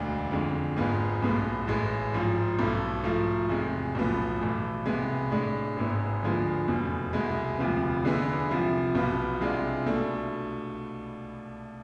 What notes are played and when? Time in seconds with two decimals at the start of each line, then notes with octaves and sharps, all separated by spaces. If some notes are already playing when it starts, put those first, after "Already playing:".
Already playing: E1 D2 D3
0.31 F2 D3 G#3
0.76 G#1 G#2 G#3 B3 F4
1.22 B1 A2 G#3 B3
1.67 A1 A2 G#3
2.13 G#1 G#2 F3
2.59 B1 B2 A3 E4
3.03 G#2 F3 A3
3.49 E2 C3 G#3
3.95 B1 A2 F3 B3
4.40 B1 A2 E3
4.86 C2 C3 G#3 B3
5.31 A2 G#3 D4
5.76 G#1 G#2 G#3 B3 E4
6.22 D2 D3 F3 G#3 B3
6.67 F1 E2 B2
7.13 C2 B2 G#3
7.58 E1 D2 C3 F3 B3
8.04 E2 D3 G#3 B3 E4
8.49 C2 C3 F3
8.95 B1 B2 B3 F4
9.41 C2 C3 G#3 D4 F4
9.86 B2 A3 D4